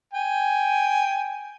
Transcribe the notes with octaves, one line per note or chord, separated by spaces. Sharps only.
G5 G#5